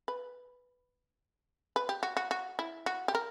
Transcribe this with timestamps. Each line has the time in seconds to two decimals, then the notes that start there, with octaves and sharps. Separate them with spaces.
0.08 B4
1.76 B4
1.89 G4
2.03 F#4
2.17 F#4
2.31 F#4
2.59 E4
2.86 F#4
3.08 G4
3.15 A#4